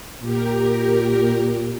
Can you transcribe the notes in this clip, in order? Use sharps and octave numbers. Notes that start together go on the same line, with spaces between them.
A#2 G4 A#4